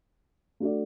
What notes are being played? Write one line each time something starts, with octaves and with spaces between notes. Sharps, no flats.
A3 D4 F#4 A4 D5